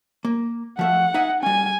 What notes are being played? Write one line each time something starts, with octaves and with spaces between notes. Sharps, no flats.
A#3
F3 A3 E5 F#5
D#4 E5 G#5
G3 C#4 G#5